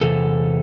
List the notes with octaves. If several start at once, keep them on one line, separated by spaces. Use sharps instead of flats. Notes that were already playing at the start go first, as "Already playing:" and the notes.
E2 C3 A4